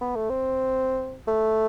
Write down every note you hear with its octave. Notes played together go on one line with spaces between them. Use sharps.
B3
A3
C4
A3